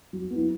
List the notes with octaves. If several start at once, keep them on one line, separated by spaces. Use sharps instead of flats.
F#3
B3
E4